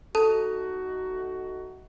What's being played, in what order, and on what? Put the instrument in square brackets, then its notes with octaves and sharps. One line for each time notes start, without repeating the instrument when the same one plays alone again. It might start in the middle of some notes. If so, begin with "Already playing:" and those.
[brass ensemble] A3 D#4 F#4 [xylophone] A4 A5